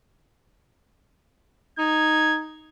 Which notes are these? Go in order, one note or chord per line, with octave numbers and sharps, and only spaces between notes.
D#4 G#6